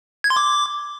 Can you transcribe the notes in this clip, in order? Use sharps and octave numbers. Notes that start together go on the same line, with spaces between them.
G#6
C6
D6